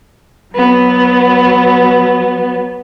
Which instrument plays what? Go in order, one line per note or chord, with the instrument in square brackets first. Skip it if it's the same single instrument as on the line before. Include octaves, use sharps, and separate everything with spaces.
[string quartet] F#3 B3